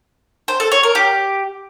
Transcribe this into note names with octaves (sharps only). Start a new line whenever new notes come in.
C5
A4
C#5
A#4
G4